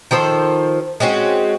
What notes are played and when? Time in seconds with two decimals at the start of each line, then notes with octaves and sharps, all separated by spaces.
0.11 D#3 F3 A4 C5
1.00 G#3 C4 C#4 F#4